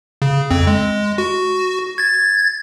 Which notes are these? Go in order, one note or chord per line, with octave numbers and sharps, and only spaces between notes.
C#3
F2 C4
G#3
F#4
G#6 A6